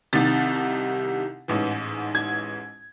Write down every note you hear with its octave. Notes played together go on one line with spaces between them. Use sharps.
C2 C3 D#3 A6
A1 G#2 E3
G#6